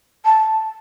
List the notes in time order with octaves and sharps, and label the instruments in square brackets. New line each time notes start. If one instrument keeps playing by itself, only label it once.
[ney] A5